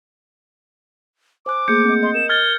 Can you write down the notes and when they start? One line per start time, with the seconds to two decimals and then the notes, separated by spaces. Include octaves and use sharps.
1.46 C5 G#5 D6 F#6
1.68 A3 A#3 G#4 G6 C#7
1.85 C4 D#5
2.03 D#5 C6
2.15 A#4 E7
2.29 F6 G#6 A6 G7